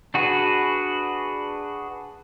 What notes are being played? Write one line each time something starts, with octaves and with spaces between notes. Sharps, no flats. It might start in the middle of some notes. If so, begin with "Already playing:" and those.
D4 F#4 G#4 B4